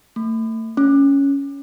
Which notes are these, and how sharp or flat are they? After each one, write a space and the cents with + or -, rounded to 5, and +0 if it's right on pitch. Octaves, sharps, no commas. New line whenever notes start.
A3 +35
C#4 +5